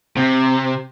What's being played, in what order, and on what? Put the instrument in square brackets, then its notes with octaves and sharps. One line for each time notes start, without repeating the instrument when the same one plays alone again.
[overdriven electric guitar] C3